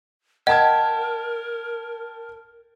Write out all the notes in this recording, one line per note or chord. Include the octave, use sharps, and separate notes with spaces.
A#4 D#5 F#5 G5 A5 G#6